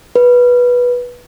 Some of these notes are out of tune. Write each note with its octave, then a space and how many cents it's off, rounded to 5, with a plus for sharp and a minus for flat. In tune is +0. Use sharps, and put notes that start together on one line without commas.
B4 -10